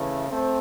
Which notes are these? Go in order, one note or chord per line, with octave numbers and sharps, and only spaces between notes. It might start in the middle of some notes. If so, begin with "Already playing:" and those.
Already playing: C#3 E3 A3
A3 C4